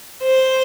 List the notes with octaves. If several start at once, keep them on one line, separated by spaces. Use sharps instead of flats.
C5